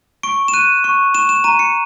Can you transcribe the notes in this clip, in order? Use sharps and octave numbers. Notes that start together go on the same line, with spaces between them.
C#6 D7
E7
F#6 D#7
C#6
C#6 E7
E7
A#5 D#7
C#7